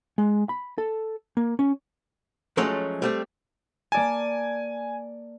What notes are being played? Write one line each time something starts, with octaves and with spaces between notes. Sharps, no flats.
G#3
B5
A4
A#3
C#4
F3 F#3 G#3 A3 C#4
G3 A3 C4
A#3 D5 G#5 A5